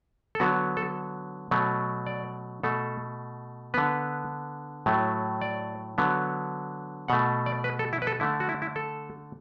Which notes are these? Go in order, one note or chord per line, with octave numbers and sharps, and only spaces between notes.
A4
D3 F#3 B3 F#4
A4
B2 F#3 A3
D5
B2 A3 A4
D3 B3 B4
A2 F#3 A3
D5
D3 F#3 B3
B2 A3 F#5
D5
B4
A4
E4
B4
A4
D3 A3 E4
F#4
E4
E4
A4